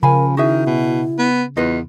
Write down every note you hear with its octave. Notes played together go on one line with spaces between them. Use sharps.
C#3 F3 A#4 F5 G#5 B5
D#3 E4 F#4 G#4 E5
B2
B3
E2 F4 B4 D#5